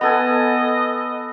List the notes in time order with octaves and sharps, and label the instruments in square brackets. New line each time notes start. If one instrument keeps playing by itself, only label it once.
[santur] B3 A4 G#5 [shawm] D#5